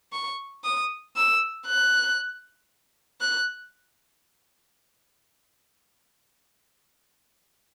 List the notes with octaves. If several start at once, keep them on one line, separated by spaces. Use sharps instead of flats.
C#6
D#6
E6
F#6
F#6